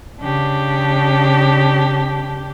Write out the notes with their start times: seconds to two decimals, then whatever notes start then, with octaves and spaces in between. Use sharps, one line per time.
0.21 C#3 D4 G4